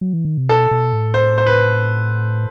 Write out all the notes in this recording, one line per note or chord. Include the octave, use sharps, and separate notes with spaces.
F#3
E3
D#3
C3
B2 A4
B2
A2
C5
C5
B4